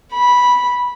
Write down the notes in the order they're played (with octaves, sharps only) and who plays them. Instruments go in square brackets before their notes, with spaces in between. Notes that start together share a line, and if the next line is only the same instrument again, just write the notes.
[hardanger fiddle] B5